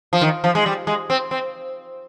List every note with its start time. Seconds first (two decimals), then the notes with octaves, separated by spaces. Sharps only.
0.13 F3
0.21 D#3
0.44 F3
0.55 G#3
0.66 G3
0.87 G#3
1.10 C4
1.31 C4